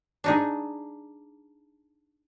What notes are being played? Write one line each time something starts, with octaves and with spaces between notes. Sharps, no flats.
D4 D#4 G#4